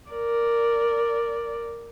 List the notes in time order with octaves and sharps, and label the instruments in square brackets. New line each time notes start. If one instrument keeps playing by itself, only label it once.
[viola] A#4 D5